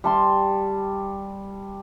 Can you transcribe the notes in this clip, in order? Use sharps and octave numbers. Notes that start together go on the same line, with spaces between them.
G3 A5 C6